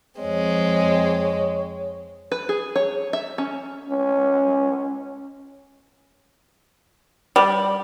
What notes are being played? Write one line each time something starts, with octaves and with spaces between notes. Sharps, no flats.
F2 G#3 C4 C#5
B4
G#4
C#5
E5
C#4
C#4
G3